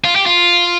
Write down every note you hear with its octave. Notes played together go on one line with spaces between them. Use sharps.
F4
G4
F4